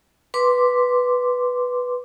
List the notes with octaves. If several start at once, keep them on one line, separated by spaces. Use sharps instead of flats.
B4 C6 D6